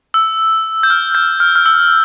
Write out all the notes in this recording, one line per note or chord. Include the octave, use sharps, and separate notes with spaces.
E6
G6
F6
G6
F6
F6
E6